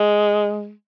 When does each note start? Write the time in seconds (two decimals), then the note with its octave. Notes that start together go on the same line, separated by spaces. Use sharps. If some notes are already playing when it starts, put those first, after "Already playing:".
Already playing: G#3